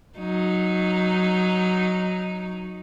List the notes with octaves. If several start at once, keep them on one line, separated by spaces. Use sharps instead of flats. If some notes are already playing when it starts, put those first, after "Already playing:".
F#3 D#4